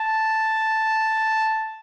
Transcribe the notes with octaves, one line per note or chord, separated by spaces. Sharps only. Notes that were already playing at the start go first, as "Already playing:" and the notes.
Already playing: A5